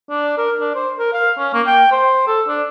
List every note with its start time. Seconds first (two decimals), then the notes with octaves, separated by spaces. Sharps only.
0.09 D4
0.37 A#4
0.60 D4
0.75 C5
0.99 A#4
1.13 F5
1.38 C#4
1.53 A#3
1.66 G5
1.91 C5
2.27 A4
2.48 D4